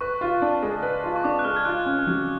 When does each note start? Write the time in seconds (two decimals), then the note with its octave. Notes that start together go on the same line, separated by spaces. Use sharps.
0.01 B4 C#6
0.21 F4
0.42 D4
0.62 G#3
0.83 B4
1.04 F4
1.16 C#6
1.24 D4 D6
1.39 F#6
1.44 G#3 F6
1.56 G#6
1.65 F4 F#6
1.86 C#4
2.07 F#3